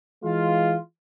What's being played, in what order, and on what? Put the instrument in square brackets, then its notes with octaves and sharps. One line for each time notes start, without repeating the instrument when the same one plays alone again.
[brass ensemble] E3 G#3 F4